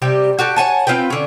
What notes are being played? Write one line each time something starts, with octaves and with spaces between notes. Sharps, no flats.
C3 G3 G4
F#4 G4 A4
C#5 F#5 G#5 A5
C4 F4 B4 G5
D3 C#4